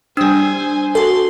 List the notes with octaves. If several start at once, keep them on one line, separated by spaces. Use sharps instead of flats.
G3 D4 C5 G#5 E6
F#4 A4 C6